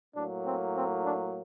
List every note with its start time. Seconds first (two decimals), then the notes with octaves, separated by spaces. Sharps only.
0.16 A2 F#3 A#3 D4
0.46 C4
0.76 C4
1.05 D4